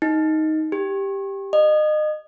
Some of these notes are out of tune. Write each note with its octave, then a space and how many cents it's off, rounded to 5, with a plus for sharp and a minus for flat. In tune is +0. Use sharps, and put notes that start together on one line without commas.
D#4 +5
G4 +5
D#5 -30